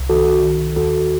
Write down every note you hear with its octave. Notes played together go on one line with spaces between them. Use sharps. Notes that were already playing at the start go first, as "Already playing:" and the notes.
Already playing: C2
D#3 F#4 A4
D#3
D#2 F#4 A4